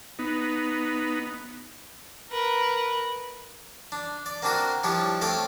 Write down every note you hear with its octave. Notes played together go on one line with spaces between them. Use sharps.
B3 D#4
A#4 B4
D4
D5
A#3 C4 D4 F#4 A#4
F3 G3 D4 E4 C#5
A3 C4 A4 C#5 F5 D6